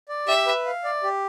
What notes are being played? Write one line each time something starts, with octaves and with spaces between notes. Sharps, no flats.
D5
G4 E5
B4
F5
D5
G4